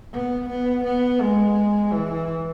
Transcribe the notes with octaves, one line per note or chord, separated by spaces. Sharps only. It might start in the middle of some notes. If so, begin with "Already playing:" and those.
B3
B3
B3
G#3
E3